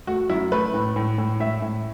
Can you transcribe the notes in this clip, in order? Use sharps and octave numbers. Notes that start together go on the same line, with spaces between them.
A3 F#4
F#2 E4
A3 B4
A2
A2
A2
A2 E5
A2